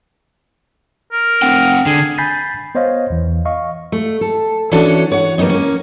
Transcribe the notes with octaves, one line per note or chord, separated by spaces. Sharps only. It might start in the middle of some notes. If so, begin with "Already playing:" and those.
A#4
C4 F#5 G5
D3 G#4
G#5 B5 G6 A6 B6 C7
B3 C5 C#5 D#5 F5
E2 E3
D#5 F5 C#6
A3
A4
E3 C#4 D4 F#4 A4 C#5
C#5 F#5
G3 A#3 B3 C#4 D#4
A#3 C#4